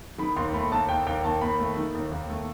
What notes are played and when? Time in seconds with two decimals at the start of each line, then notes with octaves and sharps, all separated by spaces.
0.18 D#3 B5
0.36 D#2 C6
0.54 A3 B5
0.72 D#2 A5
0.89 D#2 G5
1.07 D#2 G5
1.24 D#2 A5
1.41 D#2 B5
1.60 A3
1.77 D#3
1.95 D#2
2.12 D#2
2.30 A3